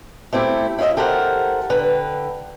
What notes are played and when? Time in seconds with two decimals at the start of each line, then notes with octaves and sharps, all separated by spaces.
0.33 A3 C4 E4 G4
0.79 E4 F4 C5 D#5 E5
0.97 G4 A4 A#4 C5 F#5
1.70 D3 B4 G5